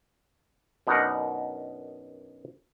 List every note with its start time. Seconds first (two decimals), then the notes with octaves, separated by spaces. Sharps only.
0.87 F#2 B2 D4 D#4 A#4 F#5